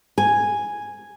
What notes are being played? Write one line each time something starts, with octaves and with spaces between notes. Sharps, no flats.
G#5